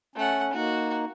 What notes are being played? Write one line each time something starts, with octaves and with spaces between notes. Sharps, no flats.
A3 C#4 F#5
A#3 D#4 F#4